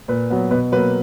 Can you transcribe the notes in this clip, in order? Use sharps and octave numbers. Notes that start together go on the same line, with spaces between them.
A#2 B4
F#3 B3
B2 B4
F#3 A#3 B4